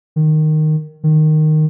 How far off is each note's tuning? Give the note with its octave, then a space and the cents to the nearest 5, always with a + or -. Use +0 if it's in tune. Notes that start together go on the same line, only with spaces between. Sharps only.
D#3 -10
D#3 -10